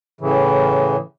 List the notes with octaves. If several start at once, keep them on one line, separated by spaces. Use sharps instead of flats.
A2 C#3 E3